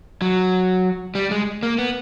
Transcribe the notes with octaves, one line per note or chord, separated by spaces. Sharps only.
F#3
G3
G#3
A#3
B3